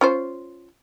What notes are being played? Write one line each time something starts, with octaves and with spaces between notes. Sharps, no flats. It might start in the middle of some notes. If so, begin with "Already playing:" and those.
C#4 F4 C5